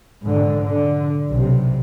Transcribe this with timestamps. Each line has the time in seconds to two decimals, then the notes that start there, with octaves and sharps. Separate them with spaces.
0.23 G#2 D3
0.62 D3
1.30 B1 C3